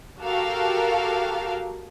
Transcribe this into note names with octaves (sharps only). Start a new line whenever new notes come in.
F#4 G4 A4 A#4 F5